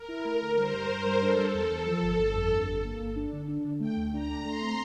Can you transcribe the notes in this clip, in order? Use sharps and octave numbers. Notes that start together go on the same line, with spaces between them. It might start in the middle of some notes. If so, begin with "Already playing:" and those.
Already playing: A#4
E4
A3
D3
G3 C5
G2
G2
G3
D4 A4
G3
E2
E2
F3
G1
G1
F2
G2
G1
A#3
G1
D4
D3
D4
D3
A3 G5
D2
D4 A#5
A3
A3 C6
C4